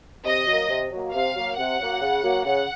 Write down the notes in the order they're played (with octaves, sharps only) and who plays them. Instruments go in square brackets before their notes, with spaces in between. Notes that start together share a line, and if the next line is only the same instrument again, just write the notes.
[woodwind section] C3 [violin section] D#5
[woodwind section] F#3 A#3
C3
F#3 A#3
[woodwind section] C3 [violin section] F5
[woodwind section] F#3 A#3
[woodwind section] C3 [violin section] F#5
[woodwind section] F#3 A#3
C#3
F#3 A#3
[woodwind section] C#3 [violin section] F#5